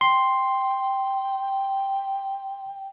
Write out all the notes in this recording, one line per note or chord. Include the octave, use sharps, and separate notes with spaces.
G5 C6